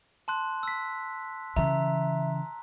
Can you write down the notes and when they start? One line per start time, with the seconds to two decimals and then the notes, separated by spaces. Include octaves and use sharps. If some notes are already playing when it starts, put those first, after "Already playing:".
0.28 A5 C6 F#6
0.63 E6 B6
1.56 C#3 E3 E5 A#5